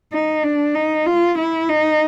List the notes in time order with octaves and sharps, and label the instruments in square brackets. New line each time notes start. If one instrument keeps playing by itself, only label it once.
[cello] D#4
D4
D#4
F4
E4
D#4